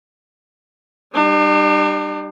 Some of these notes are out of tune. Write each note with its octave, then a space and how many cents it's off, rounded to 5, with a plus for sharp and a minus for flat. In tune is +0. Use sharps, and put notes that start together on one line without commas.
G3 +5 D4 +45